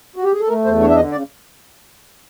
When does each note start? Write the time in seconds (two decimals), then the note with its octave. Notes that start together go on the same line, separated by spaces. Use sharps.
0.16 F#4
0.24 G4
0.33 G#4
0.40 A4
0.49 A3 A#4
0.65 E2 C5
0.80 D4 C#5
0.90 E5
0.96 D3 D#5
1.12 C#3 D5